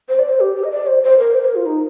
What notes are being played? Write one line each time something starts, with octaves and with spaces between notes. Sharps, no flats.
C5
D5
C5
G4
G4
D#5
D5
C5
C5
A#4
C5
A#4
F4
D#4